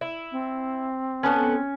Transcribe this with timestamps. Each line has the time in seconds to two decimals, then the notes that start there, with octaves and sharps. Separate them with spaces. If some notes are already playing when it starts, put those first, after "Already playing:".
0.01 E4
0.32 C4
1.23 B3 C#4 A4 B4